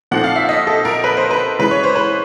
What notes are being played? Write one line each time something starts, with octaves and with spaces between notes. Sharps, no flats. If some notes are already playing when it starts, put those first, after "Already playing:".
A#2 F3 A3 C4 D#4 F#5
F5
E5
D#5
A4
A#4
B4
C5
B4
C#3 E3 G#3 B4
C#5
C5
B4